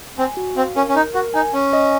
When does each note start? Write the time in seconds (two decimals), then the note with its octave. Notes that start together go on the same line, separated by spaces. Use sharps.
0.18 C4 G#5
0.37 F#4
0.57 C4 F5
0.76 C#4 A#4
0.89 C#4
0.95 D#4 A#4
1.14 F#4 A#4
1.34 D#4 G#5
1.54 C#4 G#5
1.73 D#5